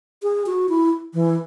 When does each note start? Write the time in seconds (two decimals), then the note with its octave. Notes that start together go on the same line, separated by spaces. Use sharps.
0.23 G#4
0.46 F#4
0.69 E4
1.14 E3